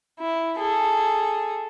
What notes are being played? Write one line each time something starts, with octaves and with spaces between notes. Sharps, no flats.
E4
G#4 A4